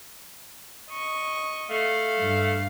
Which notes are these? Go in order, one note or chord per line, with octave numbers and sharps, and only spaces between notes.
D#5 C#6
A3 F5
G2